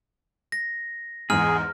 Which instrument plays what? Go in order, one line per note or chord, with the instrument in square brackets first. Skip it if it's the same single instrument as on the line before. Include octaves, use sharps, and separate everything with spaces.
[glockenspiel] A#6
[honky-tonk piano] E2 G#2 [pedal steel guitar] G#4 [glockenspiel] F6